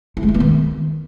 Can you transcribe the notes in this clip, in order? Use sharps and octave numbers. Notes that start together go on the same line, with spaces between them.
E4
G#3
E4
B3
D#3